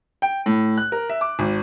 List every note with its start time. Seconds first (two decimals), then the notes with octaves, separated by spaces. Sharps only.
0.22 G5
0.46 A2
0.78 F#6
0.92 A#4
1.09 E5
1.21 D6
1.39 G#1